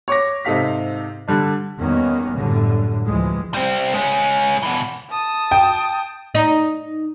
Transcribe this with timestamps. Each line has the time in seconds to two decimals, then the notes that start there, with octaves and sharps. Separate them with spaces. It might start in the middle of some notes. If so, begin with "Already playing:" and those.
0.08 C#5 C#6 D6 A#6
0.45 G#2 C3 D#4 A4 F5 B6
1.28 D3 G3 D4
1.77 E2 D#3 G3 A#3 B3 C#4
2.36 F#2 A2 D3 G3
3.06 D2 E3 F3 G3 G#3
3.54 G3 C4
3.94 G#3 C#4
4.63 B2 E3
5.10 A5 D#6
5.51 G5
6.35 D#4